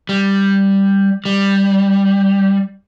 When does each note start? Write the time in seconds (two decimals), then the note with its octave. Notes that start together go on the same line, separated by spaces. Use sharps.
0.09 G3
1.25 G3